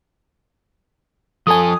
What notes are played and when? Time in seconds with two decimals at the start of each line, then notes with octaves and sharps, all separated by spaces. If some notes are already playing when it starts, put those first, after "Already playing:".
1.47 F3 A4 G#5 D#6